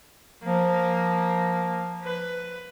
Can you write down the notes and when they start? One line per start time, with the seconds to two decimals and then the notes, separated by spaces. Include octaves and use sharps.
0.44 F3 A#3
2.04 B4